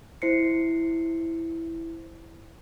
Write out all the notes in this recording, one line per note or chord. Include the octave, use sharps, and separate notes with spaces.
E4 C5 C7 C#7